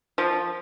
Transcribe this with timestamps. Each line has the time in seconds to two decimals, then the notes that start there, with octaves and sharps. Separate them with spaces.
0.18 F3